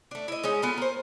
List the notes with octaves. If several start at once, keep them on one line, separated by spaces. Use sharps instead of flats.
A3 D4
E4 D#5
G#3 C#4 D#4
B3 F4 A4 G#5
A#3 C5